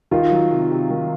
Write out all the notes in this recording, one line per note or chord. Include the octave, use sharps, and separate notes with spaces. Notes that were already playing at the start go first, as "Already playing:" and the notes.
D#3 D#4 F4
F#3
C3
C3
D#3